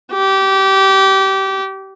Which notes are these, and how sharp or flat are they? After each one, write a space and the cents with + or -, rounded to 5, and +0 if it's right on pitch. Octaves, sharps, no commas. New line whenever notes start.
G4 -25